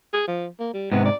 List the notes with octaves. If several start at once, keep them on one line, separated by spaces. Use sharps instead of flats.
G#4
F3
A#3
G3
G#2 C3 B3
D5